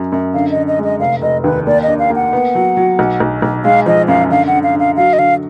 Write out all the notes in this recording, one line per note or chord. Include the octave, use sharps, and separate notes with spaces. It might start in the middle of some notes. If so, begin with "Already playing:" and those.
Already playing: F#2 F#3
F#2
D3 F5
D3 D#5
D#5
G#3
D#5
F1 F5
F1 D#5
D#2 B4
A#3 D5
D4 D#5
F5
A#3
F#5
B3
F#3
F#3
B1
B1
B1
G#3 F5
F3 D#5
F#2 F5
D3 F5
F#5
D3
F5
D3
F5
F#3 F5
D#5
D3 F5